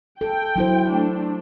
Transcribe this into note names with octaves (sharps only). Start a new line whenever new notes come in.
A4 G5
F#3 E4 C5
A3 D4